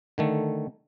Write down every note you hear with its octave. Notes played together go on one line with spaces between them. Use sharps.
D3 D#3 A3